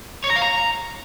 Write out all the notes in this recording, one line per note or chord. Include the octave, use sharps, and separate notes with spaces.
C#5
A#5
F5
A#5